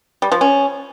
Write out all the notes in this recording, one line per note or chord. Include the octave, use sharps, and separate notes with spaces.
G3
F3
C#4